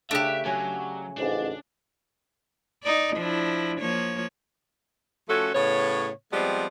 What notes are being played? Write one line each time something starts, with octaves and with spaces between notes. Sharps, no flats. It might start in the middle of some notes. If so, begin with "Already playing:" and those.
C#3 A3 D4 G4 E5
F#3 C#4
A1 F2 G#2 D4
D#4 D5
F3 D4 E4
F3 A#3 C#5
F3 A3 C#4 F#4 A4
A2 C#3 B3 C#5
F3 G3 G#3 B3 C4